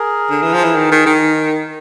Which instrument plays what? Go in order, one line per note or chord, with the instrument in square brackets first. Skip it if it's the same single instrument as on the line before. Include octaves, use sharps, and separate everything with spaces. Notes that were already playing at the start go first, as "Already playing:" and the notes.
Already playing: [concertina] G#4 A#4
[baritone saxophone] D3
E3
F3
E3
D#3
D#3
D#3